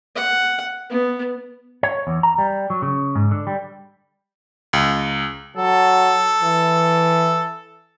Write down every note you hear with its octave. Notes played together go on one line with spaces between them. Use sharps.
F#5
B3
C#5
E2
A#5
G3
F#3
C#3
G#2
D3
G3
C#2
F#3 A4
E3